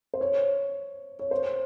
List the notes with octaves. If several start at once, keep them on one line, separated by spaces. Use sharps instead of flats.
C5
C#5
C#5
C5